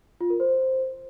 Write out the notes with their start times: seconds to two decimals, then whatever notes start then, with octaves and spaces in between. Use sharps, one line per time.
0.21 F4
0.30 A#4
0.40 C5